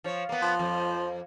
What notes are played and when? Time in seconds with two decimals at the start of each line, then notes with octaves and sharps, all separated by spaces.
0.04 F3 C#5
0.29 A#3 B3
0.42 F3
0.59 F2